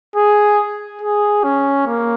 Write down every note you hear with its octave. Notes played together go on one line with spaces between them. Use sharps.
G#4
G#4
C#4
A#3